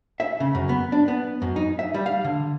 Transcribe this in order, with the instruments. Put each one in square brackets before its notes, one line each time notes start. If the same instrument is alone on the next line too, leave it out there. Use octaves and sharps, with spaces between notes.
[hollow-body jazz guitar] E5
C#3
F#2
B3
D4
B3
F#2
D#4
E5
G3
F5
D3